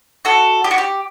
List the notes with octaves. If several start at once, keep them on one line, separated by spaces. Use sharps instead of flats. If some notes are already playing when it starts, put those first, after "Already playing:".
F#4 A4
G4
F#4
G4